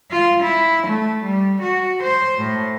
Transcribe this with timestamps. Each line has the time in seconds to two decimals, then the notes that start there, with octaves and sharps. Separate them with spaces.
0.11 F4
0.43 E4
0.87 A3
1.24 G3
1.62 F#4
2.03 C5
2.39 A2